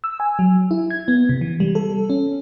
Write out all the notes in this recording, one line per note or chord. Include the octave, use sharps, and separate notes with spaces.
E6
G#5
F#3
E4
G#6
B3
C3
E3
G3
A4
C#4